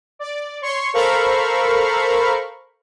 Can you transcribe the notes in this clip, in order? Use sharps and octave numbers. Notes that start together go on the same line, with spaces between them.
D5
C#5 C6 C#6
A4 A#4 C5 F5 B5 C#6